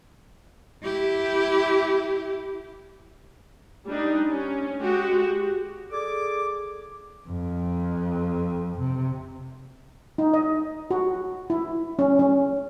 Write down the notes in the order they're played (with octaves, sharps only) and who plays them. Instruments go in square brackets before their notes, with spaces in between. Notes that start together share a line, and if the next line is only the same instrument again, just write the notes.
[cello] E4 G4
[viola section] G3 D4 D#4
C#4
G#3 F#4 G4
[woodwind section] G#4 A4 D5 D6
[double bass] F2
C3
[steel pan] D#4
D#5
F#4
E4
C#4
C#4